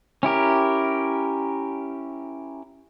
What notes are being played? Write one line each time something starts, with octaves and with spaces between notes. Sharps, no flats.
C#4 E4 G4 A#4